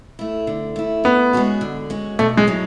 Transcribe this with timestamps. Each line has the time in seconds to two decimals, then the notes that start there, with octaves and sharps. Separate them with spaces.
0.19 A3 E4
0.47 D3
0.76 A3 E4
1.04 D3 B3
1.33 G#3 C#4 F#4
1.61 D3
1.90 G#3 C#4 F#4
2.19 B2 A3
2.37 G#3
2.47 F#3 C#4 E4